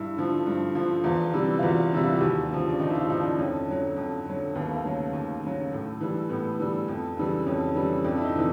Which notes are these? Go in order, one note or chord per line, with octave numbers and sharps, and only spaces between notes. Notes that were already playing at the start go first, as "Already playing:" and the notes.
Already playing: G2 E4
D3 F3
G2
D3 F3
E2 F4
C3 E3 G3
F4
E2 F#4
C3 E3 G3 E4
F4
F#4
D#2 G4
C#3 F3
D4
D#2 D#4
E4
F4
C#3 F3 D#4
D4
F2 C#4
D3 F#3
F2
D3 F#3
D#2 B3
A#3
A3
A#3
C#3 F#3
D#2
C#3 F#3
A2
E3 G3
A2 B3
E3 G3
F2
C#3 E3 G3
F2 C#4
C#3 E3 G3
F2 D4
E4
D#4
C3 E3